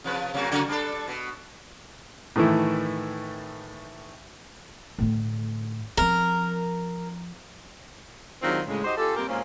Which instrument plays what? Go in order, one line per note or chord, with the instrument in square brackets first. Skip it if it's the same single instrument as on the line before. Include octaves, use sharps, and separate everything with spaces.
[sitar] C3 F3 B4
C3 F#3 A#3
C#3 F#3 F#4
G3 D4 A4
B2
[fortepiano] A2 D#3 E3 A3 E4
[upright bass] A2 D3
[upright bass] F3 C4 [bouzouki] A#4
[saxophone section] D#3 F#3 G#3 C4 D4 F4
A2 C#3 G#3
D#4 F#4 G4 C5 D#5
C#4 F4 G4 A4
G3 A#3 C4 G4 A#4
A#2 G#3 A#3 C#4 C5 F5